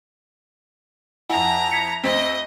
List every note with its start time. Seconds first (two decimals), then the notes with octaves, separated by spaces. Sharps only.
1.30 F2 E4 F#5 G#5 A#5
1.71 G#6 B6 C#7
2.04 D2 C4 D#5 B6